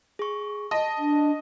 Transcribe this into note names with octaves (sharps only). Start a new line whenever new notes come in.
G#4 C#6
D#5 A5
D4